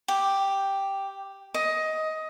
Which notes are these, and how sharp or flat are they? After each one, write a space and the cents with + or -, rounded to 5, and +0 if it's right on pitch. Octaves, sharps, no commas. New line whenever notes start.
G4 +0
D#5 +15